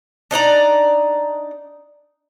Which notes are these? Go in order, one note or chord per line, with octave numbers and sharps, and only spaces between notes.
D4 D#4 D5 A#5